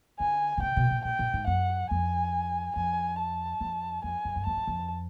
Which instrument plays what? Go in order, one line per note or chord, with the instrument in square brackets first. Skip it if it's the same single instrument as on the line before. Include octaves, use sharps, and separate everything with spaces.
[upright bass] D3 [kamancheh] G#5
[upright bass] B2
[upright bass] C3 [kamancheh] G5
[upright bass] B2
A#2
[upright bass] A#2 [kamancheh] G5
[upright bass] A#2
G#2
[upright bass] F#2 [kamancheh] F#5
[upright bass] F2 [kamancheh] G#5
[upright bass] F2 [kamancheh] G#5
[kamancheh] A5
[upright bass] F2
[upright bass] F2 [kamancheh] G#5
[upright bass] F#2
G2
[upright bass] F2 [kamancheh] A5
[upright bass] F#2
F2